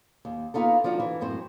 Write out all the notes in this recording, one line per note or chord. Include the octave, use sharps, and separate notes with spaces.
D#2
A#3 B3 D#4 F4 A4
F3 D4 F4 F#4
E3
F#2 A2 C4 C5